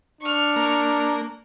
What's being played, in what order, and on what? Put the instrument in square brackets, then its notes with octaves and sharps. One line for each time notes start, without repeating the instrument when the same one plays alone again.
[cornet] D4 [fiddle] C#6 F6
[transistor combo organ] A#3